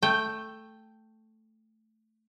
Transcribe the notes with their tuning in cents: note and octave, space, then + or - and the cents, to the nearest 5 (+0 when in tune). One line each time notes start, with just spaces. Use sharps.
A3 +0 G5 +0